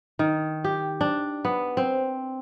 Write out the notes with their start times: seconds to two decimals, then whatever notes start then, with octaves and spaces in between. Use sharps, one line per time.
0.19 D#3
0.64 G4
1.01 D4
1.45 B3
1.77 C4